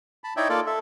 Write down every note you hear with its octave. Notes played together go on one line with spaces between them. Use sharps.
A5 B5
D#4 E4 C#5 D5 E5 G5
A#3 F4 A4 D5
A4 E5